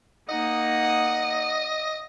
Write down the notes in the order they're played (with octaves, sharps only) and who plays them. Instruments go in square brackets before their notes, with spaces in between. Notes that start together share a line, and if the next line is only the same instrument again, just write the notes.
[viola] A#3 D#4 [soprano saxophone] D#5 [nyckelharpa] F#5 D#6